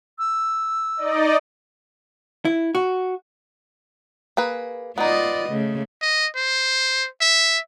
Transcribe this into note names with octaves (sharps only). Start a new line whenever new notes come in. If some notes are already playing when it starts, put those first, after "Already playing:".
E6
D#4 D5 D#5
E4
F#4
A#3 G#4 B4
B3 D#4 F4 D5 D#5
C#3 A3
D#5
C5
E5